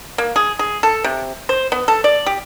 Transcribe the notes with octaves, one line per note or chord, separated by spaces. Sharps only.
A#3
G#4
G#4
A4
C3
C5
B3
A4
D5
G4